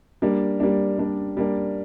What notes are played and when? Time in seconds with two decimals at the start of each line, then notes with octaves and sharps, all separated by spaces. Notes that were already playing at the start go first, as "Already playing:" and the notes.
0.22 G3 A#3 D4
0.60 G3 A#3 D4
0.98 G3 A#3 D4
1.37 G3 A#3 D4